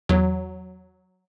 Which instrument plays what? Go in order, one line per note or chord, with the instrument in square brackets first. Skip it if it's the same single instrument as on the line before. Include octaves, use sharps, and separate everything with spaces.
[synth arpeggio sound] E2 C#5 [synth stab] F#3